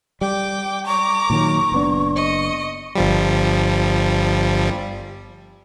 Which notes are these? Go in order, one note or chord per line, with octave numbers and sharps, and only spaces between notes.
G3 G5 D6
A#5 C#6 D6
A#2 D#3 F#3
F#1 B3 D4
D#5 C#7
G1 F3 G3